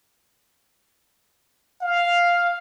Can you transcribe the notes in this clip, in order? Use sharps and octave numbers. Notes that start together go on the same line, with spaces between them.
F5